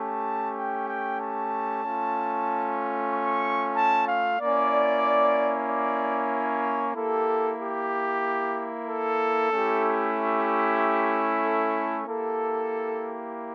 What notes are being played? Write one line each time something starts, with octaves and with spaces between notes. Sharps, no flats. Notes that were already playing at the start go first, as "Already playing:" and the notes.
Already playing: A3 C#4 G4 A5
G5
G5
A5
A3 C#4 F4
C#6
A5
F5
A#3 C#4 E4 D5
D5
C#5
A#3 E4 G4 A4
G4
A4
A3 C#4 E4 G4
G4
A4
A#3 E4 G4 A4